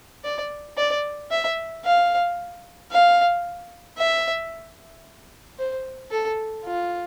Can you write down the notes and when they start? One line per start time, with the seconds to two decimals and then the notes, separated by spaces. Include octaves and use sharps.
0.24 D5
0.77 D5
1.31 E5
1.85 F5
2.91 F5
3.98 E5
5.59 C5
6.11 A4
6.65 F4